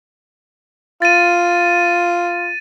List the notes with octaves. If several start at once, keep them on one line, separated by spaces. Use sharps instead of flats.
F4 A6 D#7